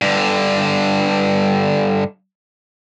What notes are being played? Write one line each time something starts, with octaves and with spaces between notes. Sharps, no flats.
G2 D3